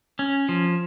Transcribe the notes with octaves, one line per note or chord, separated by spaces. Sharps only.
C#4
F3